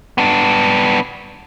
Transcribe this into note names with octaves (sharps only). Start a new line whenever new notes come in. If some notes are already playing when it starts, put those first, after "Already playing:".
B3 D4